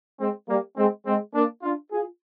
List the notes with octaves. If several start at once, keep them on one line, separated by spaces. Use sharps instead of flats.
G#3 C4
G3 A#3
G#3 C4
G#3 C4
A#3 D4
D4 F4
F4 G#4